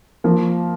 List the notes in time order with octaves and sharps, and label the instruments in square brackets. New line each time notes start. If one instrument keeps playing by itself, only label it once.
[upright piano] F3 A#3